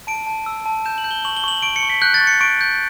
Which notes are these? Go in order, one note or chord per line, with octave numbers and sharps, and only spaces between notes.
A5 D7
A5
E6
A5
G6 E7
F#7
G6
G7
C#6 F#7
G7
C#6 F#7
C#6 D7
C#7
C#6
B6
F#6 G6
A6
C#6
C#7
C#6 D7
G6